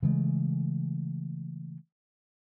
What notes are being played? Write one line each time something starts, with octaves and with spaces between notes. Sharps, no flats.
C#3 E3 G#3 A3